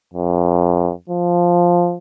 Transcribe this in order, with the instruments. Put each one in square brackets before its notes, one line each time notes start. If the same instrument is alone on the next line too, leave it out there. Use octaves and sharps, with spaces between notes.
[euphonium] F2
F3